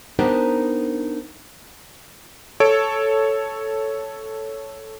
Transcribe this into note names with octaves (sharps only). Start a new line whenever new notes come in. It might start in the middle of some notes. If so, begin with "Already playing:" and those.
B3 D4 D#4 G4 A#4 C5
A4 C#5 D7